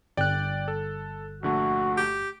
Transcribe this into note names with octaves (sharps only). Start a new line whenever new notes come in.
G1 D5 G5 F#6
A4
A#1 D3 A3 F#4
G4